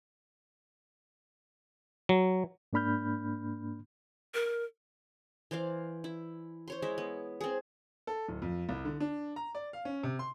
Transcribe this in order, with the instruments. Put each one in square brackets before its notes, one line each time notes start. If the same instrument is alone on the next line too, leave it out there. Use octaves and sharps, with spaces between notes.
[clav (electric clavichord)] F#3
[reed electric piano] G#2 A#3 D4 B5 F6 G6
[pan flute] A#4
[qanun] E3 C5 D5 F5
E4
C5 C#5 C6
G#3 E4 E5
B3
C4 G#4
[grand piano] A4
D1
F2
C2
D3
D4
A#5
D5
F5
C#4
C3
C6